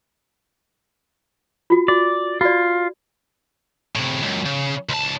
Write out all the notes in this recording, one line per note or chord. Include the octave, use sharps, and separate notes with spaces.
F4 F#4
F#4 D5
F4 F#4 D5
A2 C3
C#2 F#2
C#3
C#2 A5